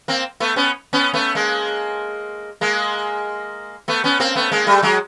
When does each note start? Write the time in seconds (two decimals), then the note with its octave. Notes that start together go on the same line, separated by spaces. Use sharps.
0.08 A#3 C4
0.40 A3 B3
0.56 B3 C#4
0.93 B3 C#4
1.14 A3 B3
1.35 G#3 A#3
2.61 G#3 A#3
3.88 A3 B3
4.04 B3 C#4
4.20 A#3 C4
4.36 A3 B3
4.52 G#3 A#3
4.67 G3 A3
4.83 F#3 G#3